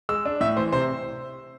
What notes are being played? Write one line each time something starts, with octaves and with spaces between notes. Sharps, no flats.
G#3 E6
D4
A2 E5
E3 C5
C3 C5